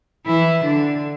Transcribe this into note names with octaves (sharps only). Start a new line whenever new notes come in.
E3 E4
D3 D4